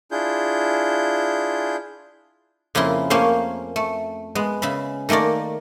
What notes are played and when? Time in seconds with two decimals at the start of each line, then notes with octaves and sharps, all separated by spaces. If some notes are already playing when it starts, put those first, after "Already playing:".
0.11 D4 E4 F4 G#4 G6
2.75 F2 C#3 A#3 E4 C6
3.10 A3 A#3 C#4 C5 F5 G#5
3.76 A3
4.35 G#3 B3
4.62 C#3 E5 B5
5.09 D#3 A3 A#3 A#4 D5